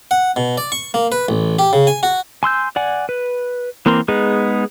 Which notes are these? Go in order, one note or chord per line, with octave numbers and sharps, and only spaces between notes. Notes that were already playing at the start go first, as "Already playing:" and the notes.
F#5
B2
D5
C#6
A#3
B4
A1
G4
C#3
G#5
F#4
G#5 C6 E6 G6
D5 F#5 G#5
B4
E3 A#3 C4 A#4 C6
G#3 B3 D#4 G#4 B4